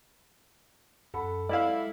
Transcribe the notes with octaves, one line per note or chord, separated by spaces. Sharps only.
F#2 A4 F#5 B5
G#3 E4 D5 F5